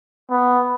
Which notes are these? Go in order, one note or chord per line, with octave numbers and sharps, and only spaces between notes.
B3